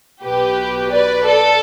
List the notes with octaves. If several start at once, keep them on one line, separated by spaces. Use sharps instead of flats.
B1 B2 G4 B4
B4 D5
A4